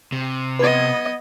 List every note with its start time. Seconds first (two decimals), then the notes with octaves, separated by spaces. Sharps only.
0.12 C3
0.59 B3 B4 D#5 G#6